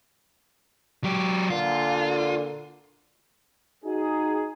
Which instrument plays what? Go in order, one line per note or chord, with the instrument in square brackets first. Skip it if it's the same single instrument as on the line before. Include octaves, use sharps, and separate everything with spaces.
[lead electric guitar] F#3 G4
[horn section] A#2 D3 [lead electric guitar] F4
[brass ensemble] D#4 F#4 G#4